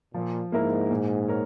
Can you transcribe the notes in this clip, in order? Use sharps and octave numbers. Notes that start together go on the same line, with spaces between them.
A#2 F3
G#2 A#3 E4 A#4
A#2
A#4 C#5